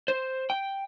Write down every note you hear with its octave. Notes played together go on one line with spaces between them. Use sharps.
C5
G5